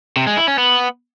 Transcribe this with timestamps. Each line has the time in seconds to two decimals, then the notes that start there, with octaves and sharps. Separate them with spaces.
0.17 C3
0.27 G#3
0.37 E4
0.48 C#4
0.58 B3